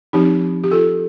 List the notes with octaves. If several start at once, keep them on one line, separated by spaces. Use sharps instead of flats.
F3 C4 D#4 G4
G4
F4 A4